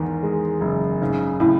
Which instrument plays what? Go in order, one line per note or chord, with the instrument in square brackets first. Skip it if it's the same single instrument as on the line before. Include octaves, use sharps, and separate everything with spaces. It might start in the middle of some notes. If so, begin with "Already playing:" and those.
Already playing: [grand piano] E2 D#3 [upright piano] G#2
[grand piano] G#3
F#1
[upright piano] G#2 [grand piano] C#3
[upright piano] A2 [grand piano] C#3